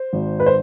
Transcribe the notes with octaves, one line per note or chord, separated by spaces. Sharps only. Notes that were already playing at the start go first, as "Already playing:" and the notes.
Already playing: C5
G#1
B4
C5